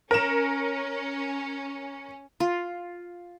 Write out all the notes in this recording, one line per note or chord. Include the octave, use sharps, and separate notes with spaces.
C#4 A#4 E7
F4